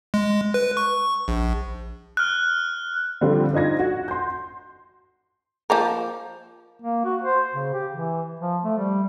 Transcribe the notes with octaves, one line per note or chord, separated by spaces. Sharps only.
G#3
B4
C#6
A#1
F6 F#6
D3 F3 G3 C4 F4
D4 D#4 F4 G#6 A#6
F#4
C6 G6
F3 A#3 A#4
A#3
F#4
C5
C#3
G4
E3
F3
A3
G3